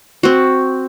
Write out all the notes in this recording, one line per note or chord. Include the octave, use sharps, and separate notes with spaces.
C4 F#4